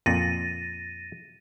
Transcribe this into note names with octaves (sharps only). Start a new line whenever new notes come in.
F2 A#2 A6 A#6 D#7